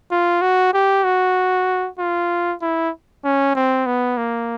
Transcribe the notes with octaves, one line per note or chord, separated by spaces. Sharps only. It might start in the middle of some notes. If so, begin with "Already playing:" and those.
F4
F#4
G4
F#4
F4
E4
C#4
C4
B3
A#3